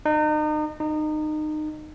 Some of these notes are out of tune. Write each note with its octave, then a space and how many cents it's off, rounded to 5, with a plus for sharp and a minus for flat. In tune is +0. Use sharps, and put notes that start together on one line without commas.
D#4 -35
D#4 -25